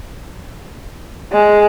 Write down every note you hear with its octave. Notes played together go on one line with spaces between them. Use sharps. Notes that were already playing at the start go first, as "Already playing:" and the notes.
G#3